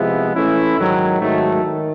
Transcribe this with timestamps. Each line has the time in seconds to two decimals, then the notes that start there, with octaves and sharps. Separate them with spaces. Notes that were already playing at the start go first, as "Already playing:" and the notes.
Already playing: C3 F3 G#3 B3 E4
0.34 E3 A3 C#4 E4
0.78 G#2 D#3 F#3
1.20 G#2 D#3 F#3 A3
1.63 D#3